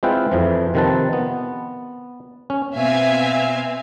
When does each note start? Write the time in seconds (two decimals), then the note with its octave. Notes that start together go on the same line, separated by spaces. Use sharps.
0.03 G#3 C4 E4 F4 B4 G5
0.31 F2 E3 F3
0.74 C3 D#3 F3 C4 B4 A5
1.13 B3
2.50 C#4
2.77 B2 C4 E5 F5 G#5